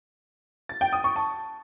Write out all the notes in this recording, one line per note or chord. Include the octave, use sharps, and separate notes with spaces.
A6
G5
D#6
C#6
A5